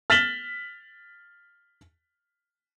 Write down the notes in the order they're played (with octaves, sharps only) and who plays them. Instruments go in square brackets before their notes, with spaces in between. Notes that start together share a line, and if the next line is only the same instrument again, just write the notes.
[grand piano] F6 A6 B6 E7 F#7 G7